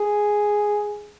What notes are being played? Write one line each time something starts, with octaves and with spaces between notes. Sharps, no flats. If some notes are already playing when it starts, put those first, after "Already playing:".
Already playing: G#4